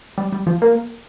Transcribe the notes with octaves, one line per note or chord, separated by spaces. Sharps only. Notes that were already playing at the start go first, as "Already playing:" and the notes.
G3
G3
F3
A#3